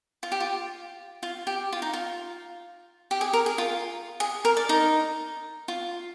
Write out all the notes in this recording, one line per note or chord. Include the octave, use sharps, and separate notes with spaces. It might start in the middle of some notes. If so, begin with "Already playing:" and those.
F4
G4
F4
F4
G4
F4
D#4
F4
G4
G#4
A#4
G#4
F4
G#4
A#4
D5
D#4
F4